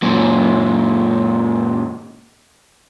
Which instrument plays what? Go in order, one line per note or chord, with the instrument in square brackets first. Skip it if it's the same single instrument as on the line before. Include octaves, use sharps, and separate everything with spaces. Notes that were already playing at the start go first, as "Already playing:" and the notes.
[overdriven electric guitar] F#2 A#2